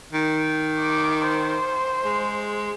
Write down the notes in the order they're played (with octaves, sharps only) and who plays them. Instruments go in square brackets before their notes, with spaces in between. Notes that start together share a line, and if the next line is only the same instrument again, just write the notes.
[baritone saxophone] D#3
[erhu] D6
C5
[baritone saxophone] G#3